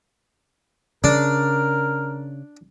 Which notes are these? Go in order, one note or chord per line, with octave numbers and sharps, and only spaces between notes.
C#3 D4 A#4